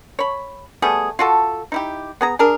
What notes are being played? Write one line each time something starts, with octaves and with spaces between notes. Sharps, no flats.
C#5 B5
G3 A3 B3 G#4
F4 F#4 A4
D#4 E4 G4
B3 G#4 A#5
D4 G#4 A#4